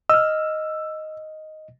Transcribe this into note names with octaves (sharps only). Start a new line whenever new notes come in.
D#5 E6 F6